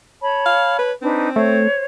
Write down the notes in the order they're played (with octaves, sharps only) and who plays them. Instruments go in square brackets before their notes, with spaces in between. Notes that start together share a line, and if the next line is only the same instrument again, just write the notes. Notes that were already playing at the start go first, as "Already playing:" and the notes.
[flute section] C#5 A5 B5
[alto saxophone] F5
B4
[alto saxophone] C4 [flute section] D4 D#4 B4
[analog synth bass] A3 [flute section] C5 C#5